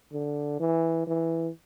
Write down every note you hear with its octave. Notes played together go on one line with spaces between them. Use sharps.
D3
E3
E3